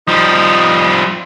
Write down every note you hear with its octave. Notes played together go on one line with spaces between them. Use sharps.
F3 G3 D#4